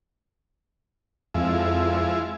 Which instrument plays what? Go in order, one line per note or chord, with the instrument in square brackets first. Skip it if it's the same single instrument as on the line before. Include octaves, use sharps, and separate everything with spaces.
[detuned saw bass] F2 [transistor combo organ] F3 G#3 E4